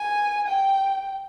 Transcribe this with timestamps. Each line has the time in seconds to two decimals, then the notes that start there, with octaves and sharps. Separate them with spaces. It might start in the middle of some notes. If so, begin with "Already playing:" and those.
Already playing: G#5
0.48 G5